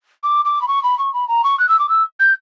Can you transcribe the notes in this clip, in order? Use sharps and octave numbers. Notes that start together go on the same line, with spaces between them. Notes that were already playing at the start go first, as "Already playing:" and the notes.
D6
D6
B5
C#6
B5
C#6
B5
A#5
C#6
F#6
E6
D6
E6
G6